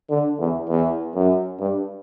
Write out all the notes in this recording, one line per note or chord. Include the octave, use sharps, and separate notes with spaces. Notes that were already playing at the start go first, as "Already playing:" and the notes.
D3
E2
E2
F#2
G2